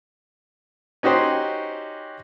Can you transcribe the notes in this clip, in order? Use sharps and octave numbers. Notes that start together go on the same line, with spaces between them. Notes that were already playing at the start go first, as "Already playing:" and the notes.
C#4 D#4 F#4 G4 C5